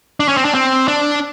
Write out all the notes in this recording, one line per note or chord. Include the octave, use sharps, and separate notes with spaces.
D4
C#4
C4
D4
C4
D4